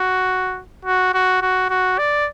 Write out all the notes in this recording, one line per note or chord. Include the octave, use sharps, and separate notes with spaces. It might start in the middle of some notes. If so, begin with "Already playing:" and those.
Already playing: F#4
F#4
F#4
F#4
F#4
D5